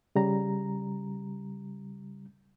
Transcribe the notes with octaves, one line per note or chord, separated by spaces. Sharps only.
C#3 G3 A#5